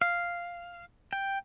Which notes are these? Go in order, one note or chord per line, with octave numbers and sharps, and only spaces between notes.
F5
G5